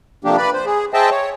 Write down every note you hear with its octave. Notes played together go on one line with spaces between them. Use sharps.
C3 F3 A3 A#3 D4 G4
B4 D5 B5
C5
G#4
G#4 C5 D#5 E5 G5 A5
C#5